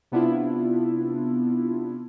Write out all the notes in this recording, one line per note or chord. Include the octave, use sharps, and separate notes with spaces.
C3 B3 D4 E4 F4